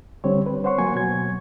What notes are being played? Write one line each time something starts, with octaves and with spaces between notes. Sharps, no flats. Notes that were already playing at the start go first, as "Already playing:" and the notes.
D3 G3 C4 C5 C#5
B4
C5 C#5 F#5 C6 C#6
F#3 A#3 G#5 C#6
B2 F#3 G#6